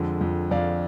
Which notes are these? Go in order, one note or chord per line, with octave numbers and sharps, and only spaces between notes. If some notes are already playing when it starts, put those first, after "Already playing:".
Already playing: F2 D3 G#3
F2
F2 D5 F5